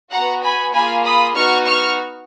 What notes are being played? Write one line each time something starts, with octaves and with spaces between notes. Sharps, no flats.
B3 F#4 F#5 A#5
G#5 B5
A#3 F4 G#4 G#5 B5
B5 D#6
B3 D#4 F#4 C#6 F6
C#6 F6